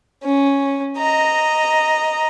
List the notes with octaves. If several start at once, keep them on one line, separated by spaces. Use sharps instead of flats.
C#4
D#5 A#5